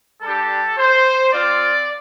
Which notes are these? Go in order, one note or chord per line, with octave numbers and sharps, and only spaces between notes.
G3 D4 G4 A4
C5
C4 F4 D5